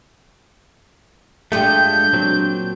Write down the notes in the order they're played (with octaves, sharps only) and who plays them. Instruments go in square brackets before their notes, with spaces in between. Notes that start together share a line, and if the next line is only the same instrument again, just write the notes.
[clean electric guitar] G2 G#3 A3 [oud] D4 F4 G4 [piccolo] G6
[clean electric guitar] A#2 F#3 C4